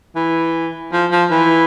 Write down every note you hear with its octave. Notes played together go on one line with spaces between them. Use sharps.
E3
F3
F3
E3